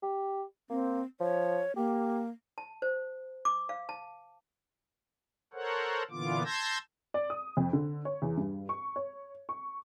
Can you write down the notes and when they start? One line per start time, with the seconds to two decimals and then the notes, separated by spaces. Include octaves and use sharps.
0.03 G4
0.70 A#3 C4
1.20 F3 C#5
1.76 A#3 G4
2.58 A5
2.82 C5
3.45 D6
3.69 F5
3.89 A5
5.53 A4 A#4 C5 C#5 F#5
6.10 A#2 D3 E3 B3 F4 D6
6.45 A5 C6 E6 G6 G#6 A#6
7.14 D5
7.30 D#6
7.57 F2
7.73 D3
8.05 C#5
8.22 E2
8.37 G2
8.69 C#6
8.96 C#5
9.49 C#6